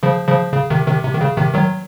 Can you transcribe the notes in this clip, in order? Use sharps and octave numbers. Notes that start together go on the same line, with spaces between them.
C#3 F3
C#3 F3
C#3
C3 D#3
C3 D#3
C3
D#3
C#3
C3 D#3
D#3 F#3